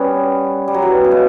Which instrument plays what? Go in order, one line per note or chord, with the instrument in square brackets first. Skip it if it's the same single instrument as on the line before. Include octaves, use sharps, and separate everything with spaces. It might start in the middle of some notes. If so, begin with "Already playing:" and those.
Already playing: [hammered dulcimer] G3 B3 C#4
G3
F#3
E3
C#3
B2